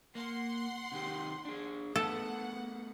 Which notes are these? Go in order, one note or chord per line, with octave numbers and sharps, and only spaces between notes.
A#3 F#5 C6
C3 D#3 G4
D4 G#4
A3 B3 A4 F#5